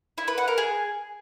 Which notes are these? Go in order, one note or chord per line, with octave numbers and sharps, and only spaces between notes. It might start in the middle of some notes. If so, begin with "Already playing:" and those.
E4
B4
F#5
A#4
G#4